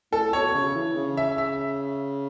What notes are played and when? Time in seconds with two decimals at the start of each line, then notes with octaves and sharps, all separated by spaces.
0.12 A2 A4
0.33 B2 C#5
0.54 C#3
0.75 E3
0.97 C#3
1.17 E5
1.38 E5